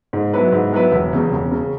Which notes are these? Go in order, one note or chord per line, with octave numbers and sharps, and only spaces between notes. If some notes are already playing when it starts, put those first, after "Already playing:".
G#2
F#3 B3 E4 B4
G#2
F#3 B3 E4 B4
E1
E2 C#3
E1
C#3